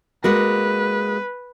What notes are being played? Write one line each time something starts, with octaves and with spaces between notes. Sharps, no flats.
G#3 A#3 F#4 B4